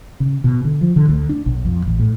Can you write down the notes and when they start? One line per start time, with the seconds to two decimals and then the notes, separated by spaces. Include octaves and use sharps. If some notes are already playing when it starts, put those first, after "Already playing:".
0.20 C#3
0.44 B2
0.64 D3
0.81 F3
0.96 D3
1.09 D2
1.29 D4
1.46 B1
1.65 F2
1.86 A1
1.99 A2